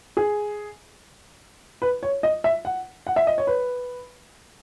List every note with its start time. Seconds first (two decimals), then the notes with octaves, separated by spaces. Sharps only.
0.17 G#4
1.82 B4
2.03 C#5
2.23 D#5
2.44 E5
2.65 F#5
3.07 F#5
3.16 E5
3.27 D#5
3.38 C#5
3.47 B4